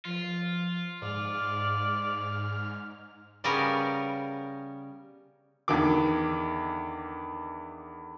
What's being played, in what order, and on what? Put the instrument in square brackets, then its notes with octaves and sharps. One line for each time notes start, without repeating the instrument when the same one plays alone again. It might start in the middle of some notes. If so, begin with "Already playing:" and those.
[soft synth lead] F3 [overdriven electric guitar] F4
[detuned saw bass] G#2 [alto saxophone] D5 [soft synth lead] F6
[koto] C#3 G3 B3 C#4 A#4
[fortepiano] E2 D3 D#3 D6